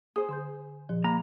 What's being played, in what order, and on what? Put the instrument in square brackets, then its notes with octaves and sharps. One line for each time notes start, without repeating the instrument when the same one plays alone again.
[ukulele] G#4 C5 [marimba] D#6
[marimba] D3 C6 G6
A#2 F3
[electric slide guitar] A#3 A#5 [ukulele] B5